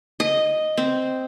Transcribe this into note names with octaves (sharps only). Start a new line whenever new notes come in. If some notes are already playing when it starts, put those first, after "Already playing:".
D#5
C4